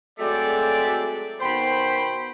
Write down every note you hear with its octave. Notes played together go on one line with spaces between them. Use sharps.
F#3 G#3 A3 C4 D5
B2 D#3 C5 G5 B5